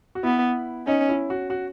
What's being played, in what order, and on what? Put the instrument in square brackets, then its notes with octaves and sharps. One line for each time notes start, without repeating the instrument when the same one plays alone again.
[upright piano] F#4
[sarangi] B3 [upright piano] E4
[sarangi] C#4 [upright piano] D#4
[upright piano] E4
F#4
F#4